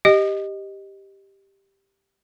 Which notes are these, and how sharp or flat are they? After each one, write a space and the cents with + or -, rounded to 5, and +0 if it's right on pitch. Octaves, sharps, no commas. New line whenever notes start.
G4 +0 D#5 +0